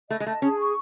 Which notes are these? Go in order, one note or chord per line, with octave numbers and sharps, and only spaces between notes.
A3 D#5
G#3
A3 A5
C#4 G#4
C#6